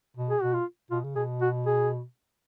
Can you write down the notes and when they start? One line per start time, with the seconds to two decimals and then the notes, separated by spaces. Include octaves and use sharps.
0.17 B2
0.30 G#4
0.41 B2 F#4
0.54 F4
0.90 B2 F4
1.04 C#3
1.16 B2 G#4
1.41 F#4
1.66 G#4